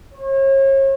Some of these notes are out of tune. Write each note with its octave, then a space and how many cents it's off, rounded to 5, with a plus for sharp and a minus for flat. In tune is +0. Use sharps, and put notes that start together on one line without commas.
C#5 -40